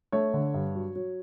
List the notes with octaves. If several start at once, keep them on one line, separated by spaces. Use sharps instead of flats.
A3 C#5
D3
G2
F#3
F#3